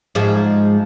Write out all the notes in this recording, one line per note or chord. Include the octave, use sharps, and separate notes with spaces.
G#2 F3 G#3